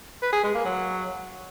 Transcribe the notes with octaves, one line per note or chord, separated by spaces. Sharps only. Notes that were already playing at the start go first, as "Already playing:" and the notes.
B4
G#4
G#3
A#3
F#3